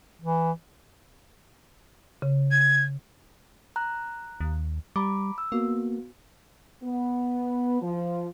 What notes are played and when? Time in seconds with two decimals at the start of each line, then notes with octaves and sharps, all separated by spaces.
0.22 E3
2.22 C#3
2.51 G#6
3.76 A#5 F#6
4.40 D#2
4.96 G3 A#5 B5 D6
5.38 E6
5.52 A#3 B3 F#4
6.82 B3
7.82 F3